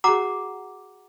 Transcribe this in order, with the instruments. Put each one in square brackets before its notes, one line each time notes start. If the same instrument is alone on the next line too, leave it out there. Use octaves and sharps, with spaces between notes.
[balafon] F#4 G#4 [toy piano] F#5 A#5 D6